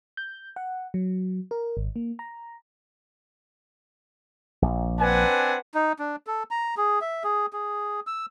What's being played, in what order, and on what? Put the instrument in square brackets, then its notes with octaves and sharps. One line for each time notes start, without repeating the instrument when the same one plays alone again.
[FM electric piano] G6
F#5
F#3
A#4
G#1
A#3
A#5
[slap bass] A#1
[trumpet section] C4 D4 G#5 [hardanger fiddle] B4 F#5
[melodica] D#4
D4
A4
A#5
G#4
E5
G#4
G#4
E6